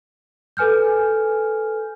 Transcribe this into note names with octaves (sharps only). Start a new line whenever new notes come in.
A4 B4 G#5 F6 G6